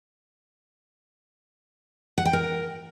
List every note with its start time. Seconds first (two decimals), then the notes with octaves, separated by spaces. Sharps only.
2.18 F#5
2.25 G5
2.33 A#4